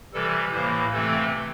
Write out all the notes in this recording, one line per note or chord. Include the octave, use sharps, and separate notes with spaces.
C3 E3 G3 A4
A2 E3 A#3 C5
C3 E3 A3 C4 A4